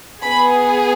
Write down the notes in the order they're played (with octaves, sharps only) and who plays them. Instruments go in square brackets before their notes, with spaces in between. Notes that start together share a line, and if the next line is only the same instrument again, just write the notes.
[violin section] B3 G#4 B5